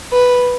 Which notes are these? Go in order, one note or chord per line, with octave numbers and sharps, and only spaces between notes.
B4